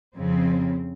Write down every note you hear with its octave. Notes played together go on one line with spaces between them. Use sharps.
F2 C#3 F3 C4